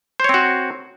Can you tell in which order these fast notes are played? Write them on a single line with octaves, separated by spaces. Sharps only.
C5 C#5 C4 F#4